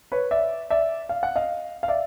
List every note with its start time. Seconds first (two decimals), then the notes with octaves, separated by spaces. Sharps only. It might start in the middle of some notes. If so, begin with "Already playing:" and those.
0.12 B4 C#5
0.31 D5 E5
0.70 D5 E5
1.09 F5
1.23 F#5
1.36 D#5 F5
1.83 F5
1.88 D5 E5